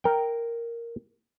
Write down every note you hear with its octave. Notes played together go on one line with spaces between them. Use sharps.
A#4 G5